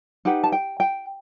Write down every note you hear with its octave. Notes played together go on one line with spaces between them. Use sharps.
D#4 G4 B4 F#5
A5
G5
G5